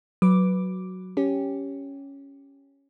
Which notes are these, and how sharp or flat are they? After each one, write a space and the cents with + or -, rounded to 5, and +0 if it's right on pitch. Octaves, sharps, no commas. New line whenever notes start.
F#3 +0 B4 +0 D6 +0
C#4 +0 G4 +0